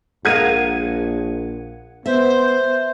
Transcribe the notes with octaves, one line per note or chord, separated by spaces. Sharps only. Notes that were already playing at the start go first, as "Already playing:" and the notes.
A#1 G#4 A#4 F5 F#5 G#6 D#7
B3 C5 E5